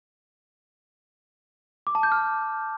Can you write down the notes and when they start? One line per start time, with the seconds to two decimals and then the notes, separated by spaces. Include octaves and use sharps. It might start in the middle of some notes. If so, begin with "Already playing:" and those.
1.87 D6
1.95 A5
2.03 G6
2.12 F6